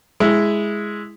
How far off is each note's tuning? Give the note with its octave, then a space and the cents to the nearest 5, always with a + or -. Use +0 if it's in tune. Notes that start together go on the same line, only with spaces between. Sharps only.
G#3 +0 E4 +0